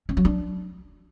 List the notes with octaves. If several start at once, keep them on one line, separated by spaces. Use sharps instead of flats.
C#4
F#3
D4